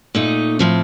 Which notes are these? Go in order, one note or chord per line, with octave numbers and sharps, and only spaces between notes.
A#2 A3 D#4
A2 F3 C4